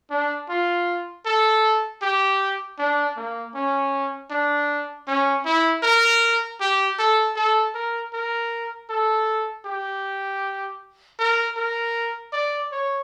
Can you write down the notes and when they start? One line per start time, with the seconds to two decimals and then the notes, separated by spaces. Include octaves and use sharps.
0.10 D4
0.49 F4
1.26 A4
2.02 G4
2.79 D4
3.17 A#3
3.54 C#4
4.31 D4
5.07 C#4
5.45 E4
5.83 A#4
6.60 G4
6.99 A4
7.36 A4
7.75 A#4
8.13 A#4
8.90 A4
9.65 G4
11.19 A#4
11.57 A#4
12.33 D5
12.72 C#5